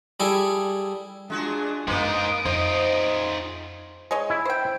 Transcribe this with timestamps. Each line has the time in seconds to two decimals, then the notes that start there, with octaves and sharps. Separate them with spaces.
0.20 G3 E4 G#4 A4
1.30 G#3 D4 F4 F#4 G#4
1.87 F#2 G#3 A#3 B3 D#4 C5 D#6 D7
2.45 F2 D#4 F4 C5
4.11 G#3 C#5 D#5
4.30 E4
4.45 C5 G5